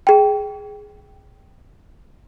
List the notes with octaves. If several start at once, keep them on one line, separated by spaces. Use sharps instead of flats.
G#4 G5